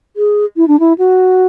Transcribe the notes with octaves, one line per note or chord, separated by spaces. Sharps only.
G#4
E4
D4
E4
F#4